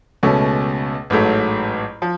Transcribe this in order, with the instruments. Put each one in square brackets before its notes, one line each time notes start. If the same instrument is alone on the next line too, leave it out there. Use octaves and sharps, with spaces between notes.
[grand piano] C#2 B2 A3 C#4
A1 G#2 F#3 A3
F3